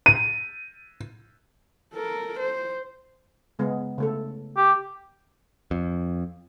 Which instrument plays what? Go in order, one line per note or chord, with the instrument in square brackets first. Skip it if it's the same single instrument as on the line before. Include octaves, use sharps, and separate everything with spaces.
[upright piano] D#7
[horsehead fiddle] A4 A#4
C5
[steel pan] C#3 G#3 B3
C#3 A3 A4
[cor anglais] G4
[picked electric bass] F2